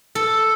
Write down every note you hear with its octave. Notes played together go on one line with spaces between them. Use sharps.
A4